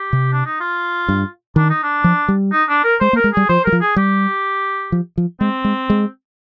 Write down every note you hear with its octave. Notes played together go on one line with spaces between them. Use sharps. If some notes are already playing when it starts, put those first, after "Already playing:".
Already playing: G4
C3
D4
D#4
F4
G2
D#3 D4
D#4
D4
F3
G3
D#4
D4
A#4
G#3 C5
A#3
A#4
G#3
G3 G#4
F3 C5
G3 A#4
F3
G#4
G3 G4
F3
F3
G#3 C4
G#3
G#3